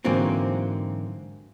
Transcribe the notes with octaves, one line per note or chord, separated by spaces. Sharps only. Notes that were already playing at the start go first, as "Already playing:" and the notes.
G#2 D3 E3 F#3 A#3 C4